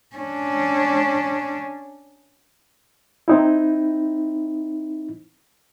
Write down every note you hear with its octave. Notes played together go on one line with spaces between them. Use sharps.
C#4 D4
C4 D#4 E4